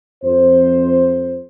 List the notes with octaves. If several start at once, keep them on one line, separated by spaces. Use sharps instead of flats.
F2 C5